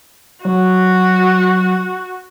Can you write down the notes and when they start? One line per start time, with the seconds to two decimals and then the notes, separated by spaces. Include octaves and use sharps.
0.45 F#3 F#4